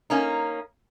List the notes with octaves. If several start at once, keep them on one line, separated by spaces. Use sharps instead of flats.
A#3 C#4 D#4